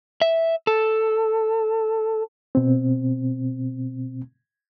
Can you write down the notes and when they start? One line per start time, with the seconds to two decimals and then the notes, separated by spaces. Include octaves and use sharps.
0.22 E5
0.67 A4
2.55 B2 C4